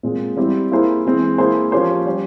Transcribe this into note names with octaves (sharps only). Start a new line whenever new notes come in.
A#2 G#3 C4
G3 C4 E4 G4
A#3 E4 G#4 C5
E3 G#3 C4
A#3 E4 G#4 C5
F3 A#3 C#4 G4 C5
G3 C#4 G4 C5